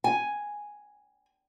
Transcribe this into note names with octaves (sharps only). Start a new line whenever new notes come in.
G#5